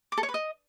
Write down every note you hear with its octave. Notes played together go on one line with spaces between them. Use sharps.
D6
A4
C#5
B4
D#5